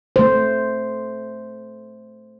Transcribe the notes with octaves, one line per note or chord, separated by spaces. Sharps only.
A3 C5